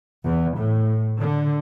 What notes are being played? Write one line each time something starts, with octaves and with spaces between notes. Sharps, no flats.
E2
A2
D3